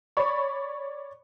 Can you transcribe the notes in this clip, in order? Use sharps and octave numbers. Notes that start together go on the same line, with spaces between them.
C#5 D5 B5 C#6